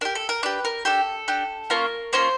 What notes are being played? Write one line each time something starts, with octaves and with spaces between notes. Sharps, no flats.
D4 G4 A#4
A4
A#4
D4 G4 B4
A#4
D4 G4 A4
D4 G4
A#3 C#4 F4 A#4
A#3 C#4 F4 C5